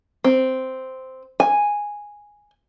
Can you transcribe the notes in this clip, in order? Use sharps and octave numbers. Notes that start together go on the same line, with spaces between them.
C4
G#5